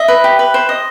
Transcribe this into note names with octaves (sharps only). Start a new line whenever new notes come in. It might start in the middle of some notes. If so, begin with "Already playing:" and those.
Already playing: D#5 E5
B4
G4
B4
C5
D#5